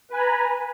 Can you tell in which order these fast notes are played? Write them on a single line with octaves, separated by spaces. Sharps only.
B4 G#5 B5 A#5